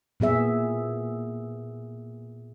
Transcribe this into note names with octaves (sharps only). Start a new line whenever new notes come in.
A#2 B3 G#4 E5